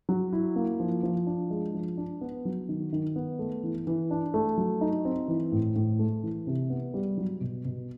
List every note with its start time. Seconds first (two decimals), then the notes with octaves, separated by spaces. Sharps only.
0.09 F#3
0.33 E4
0.56 A#3
0.80 F3
1.03 F3
1.27 D4
1.50 G#3
1.74 F3
1.98 D4
2.21 B3
2.45 F#3
2.69 D#3
2.93 D#3
3.16 B3
3.39 A3
3.63 E3
3.87 E3
4.11 D4
4.34 A3
4.58 F#3
4.81 D#4
5.05 C4
5.28 E3
5.52 A2
5.76 A2
5.99 A3
6.23 E3
6.47 C3
6.70 B3
6.94 G3
7.18 F#3
7.41 B2
7.65 B2